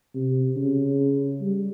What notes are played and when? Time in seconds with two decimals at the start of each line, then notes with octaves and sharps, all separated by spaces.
0.15 C3
0.57 C#3
1.41 G3